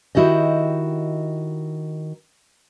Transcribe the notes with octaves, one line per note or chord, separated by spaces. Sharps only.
D#3 E4 F#4 G4 D#5